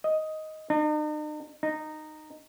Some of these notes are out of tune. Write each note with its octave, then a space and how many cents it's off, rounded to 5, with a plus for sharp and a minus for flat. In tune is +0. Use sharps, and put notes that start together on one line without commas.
D#5 +5
D#4 -45
D#4 -15